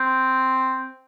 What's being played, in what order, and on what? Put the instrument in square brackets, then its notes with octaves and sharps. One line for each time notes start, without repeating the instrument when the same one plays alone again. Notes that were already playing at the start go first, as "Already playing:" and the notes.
Already playing: [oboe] C4